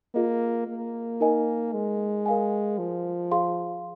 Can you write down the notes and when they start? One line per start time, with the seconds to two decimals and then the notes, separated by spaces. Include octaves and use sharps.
0.15 A#3 F4 G#4 D#5
0.68 A#3
1.20 D#4 A#4 D#5 G#5
1.73 G#3
2.26 A#4 F5 G#5
2.79 F3
3.31 G#4 F5 C6